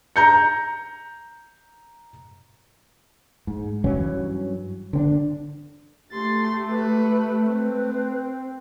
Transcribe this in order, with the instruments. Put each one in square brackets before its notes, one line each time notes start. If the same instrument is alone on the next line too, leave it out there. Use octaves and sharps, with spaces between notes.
[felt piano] A#5 G6 C#7
[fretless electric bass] G#2
G2 E3 F#3 C#4
D3 C4 D4
[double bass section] A3 [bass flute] G4 [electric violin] C6 A6
[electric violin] B4
[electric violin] C4 [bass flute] B4